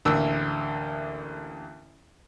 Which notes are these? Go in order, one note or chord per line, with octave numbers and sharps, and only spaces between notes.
A1 D2 A#3 E6